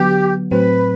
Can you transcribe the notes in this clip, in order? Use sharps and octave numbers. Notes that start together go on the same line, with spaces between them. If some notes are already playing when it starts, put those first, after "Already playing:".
Already playing: D3 F#3 B3 G4
A2 F#3 C4 B4